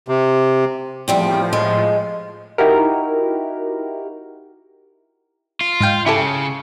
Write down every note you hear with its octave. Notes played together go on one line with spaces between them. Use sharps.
C3
E2 A2 F3 G3 C4
G#3
D#4 E4 F#4 G4 A#4
F4
G#2 F5 G5
C#3 E4 G4 A4